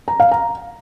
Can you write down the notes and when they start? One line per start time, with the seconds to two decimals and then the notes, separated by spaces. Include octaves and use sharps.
0.08 A#5
0.20 F5
0.31 A#5